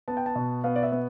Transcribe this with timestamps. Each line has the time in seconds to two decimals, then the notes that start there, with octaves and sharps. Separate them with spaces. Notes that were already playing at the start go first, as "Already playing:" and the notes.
0.08 B3 A5
0.17 G5
0.26 A5
0.35 B2
0.64 B3 F5
0.76 D5
0.83 E5
0.92 B3